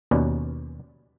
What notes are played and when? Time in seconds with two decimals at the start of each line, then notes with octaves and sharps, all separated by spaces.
0.11 D#2 B2 C#4 B4 D5